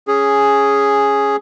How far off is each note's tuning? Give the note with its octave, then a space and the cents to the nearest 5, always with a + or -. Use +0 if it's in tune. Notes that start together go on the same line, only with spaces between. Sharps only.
C#4 +0 G#4 +0